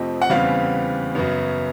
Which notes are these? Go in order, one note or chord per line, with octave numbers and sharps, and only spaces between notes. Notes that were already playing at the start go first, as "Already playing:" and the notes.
Already playing: F2 C3 F3 A3 C4 D#5
F#5
E2 C#3 E3 G3 C4 F5
F#2 C#3 F#3 B3